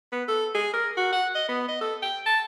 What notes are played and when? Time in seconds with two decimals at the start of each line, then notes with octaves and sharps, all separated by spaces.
0.12 B3
0.28 A4
0.55 G#4
0.74 A#4
0.97 F#4
1.12 F#5
1.35 D#5
1.49 B3
1.69 D#5
1.81 A4
2.03 G5
2.26 A5